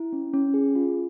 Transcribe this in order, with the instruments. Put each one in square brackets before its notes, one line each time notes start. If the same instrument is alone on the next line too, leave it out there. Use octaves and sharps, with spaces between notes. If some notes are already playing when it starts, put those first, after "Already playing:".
Already playing: [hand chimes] E4
C#4
C#4
G#4
F4